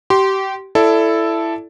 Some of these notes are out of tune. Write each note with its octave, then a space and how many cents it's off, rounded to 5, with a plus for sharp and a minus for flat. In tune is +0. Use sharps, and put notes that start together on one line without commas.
G4 -25 C6 +0
E4 +15 A4 +0 D5 +0